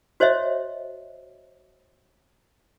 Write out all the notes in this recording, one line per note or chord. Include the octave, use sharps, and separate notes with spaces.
F#4 C5 C#5 D#5 E5